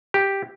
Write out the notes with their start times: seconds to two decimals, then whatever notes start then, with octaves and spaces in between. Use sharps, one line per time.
0.14 G4